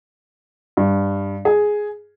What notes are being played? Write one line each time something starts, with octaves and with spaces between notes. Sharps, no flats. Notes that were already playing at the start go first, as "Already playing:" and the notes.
G2
G#4